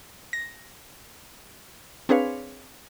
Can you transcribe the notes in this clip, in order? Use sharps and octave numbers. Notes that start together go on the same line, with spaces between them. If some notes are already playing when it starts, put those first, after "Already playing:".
A#6
C4 D4 G#4 B4 C#5 F5